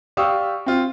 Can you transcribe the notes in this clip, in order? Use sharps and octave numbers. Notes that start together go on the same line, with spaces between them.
G4 D5 F5 C#6 D#6 E6
C4 F4